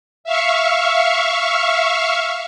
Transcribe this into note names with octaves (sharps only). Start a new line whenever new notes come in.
E5 F5 C#6